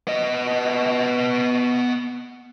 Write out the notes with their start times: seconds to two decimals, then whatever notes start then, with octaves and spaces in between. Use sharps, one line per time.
0.07 B3 D#5